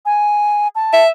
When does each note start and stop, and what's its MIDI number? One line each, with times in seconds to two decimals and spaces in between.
0.06 0.68 80
0.75 1.03 81
0.93 1.09 76